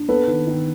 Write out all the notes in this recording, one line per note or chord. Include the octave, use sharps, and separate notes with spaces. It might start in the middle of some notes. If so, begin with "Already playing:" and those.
Already playing: D4
B3 A4 B4
D#3
D#3